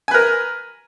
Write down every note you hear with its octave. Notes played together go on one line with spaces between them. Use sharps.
A#4 B4 G#5